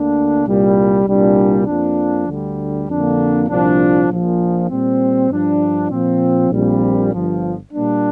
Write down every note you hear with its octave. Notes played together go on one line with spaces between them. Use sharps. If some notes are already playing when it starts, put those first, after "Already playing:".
Already playing: D2 D3 A#3 D4
C2 A#2 G3
C2 A#2 G3 D4
F2 F3 A#3 D4
D2 D3 G3
F2 D3 A#3 D4
C2 A#2 F3 D4
A#1 A#2 F3
A#2 G3 C4
G2 F3 D4
A#2 F3 C4
A#1 A#2 G3 C4
G1 G2 F3
A#2 G3 A#3 D4